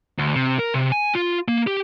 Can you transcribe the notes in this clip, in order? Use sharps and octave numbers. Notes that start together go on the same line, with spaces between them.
D2
C3
A#4
C3
G#5
F4
A#3
G4